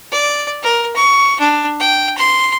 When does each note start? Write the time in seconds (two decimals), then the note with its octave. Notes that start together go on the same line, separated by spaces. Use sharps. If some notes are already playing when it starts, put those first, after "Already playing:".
0.12 D5
0.63 A#4
0.96 C#6
1.40 D4
1.80 G5
2.18 C6